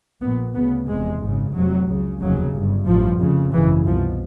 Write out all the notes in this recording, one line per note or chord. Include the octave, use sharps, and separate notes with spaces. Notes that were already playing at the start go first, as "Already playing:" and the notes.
A#1 A#2 B3
D2 C#3 B3
F1 E2 C3 G#3
G#1 F#2 C#3
F1 F2 C3 F#3
C#2 C#3
F1 D#2 C#3 F#3
G1 G2
A1 G2 F3
F1 F2 C#3
G#1 F#2 C#3 E3
C2 B2 F3